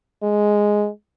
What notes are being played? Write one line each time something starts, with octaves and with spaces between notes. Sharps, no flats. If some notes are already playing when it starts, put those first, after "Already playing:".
G#3